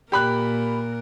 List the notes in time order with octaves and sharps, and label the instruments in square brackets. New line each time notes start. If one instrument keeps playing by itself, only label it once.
[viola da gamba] A#2 A#4 [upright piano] G4 B5 F#6